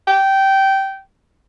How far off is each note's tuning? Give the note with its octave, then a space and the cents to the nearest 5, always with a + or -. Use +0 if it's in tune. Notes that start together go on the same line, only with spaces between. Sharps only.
G5 -15